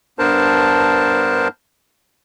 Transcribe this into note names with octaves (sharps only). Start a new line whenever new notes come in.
G2 B3 D4 A#4 C5 A5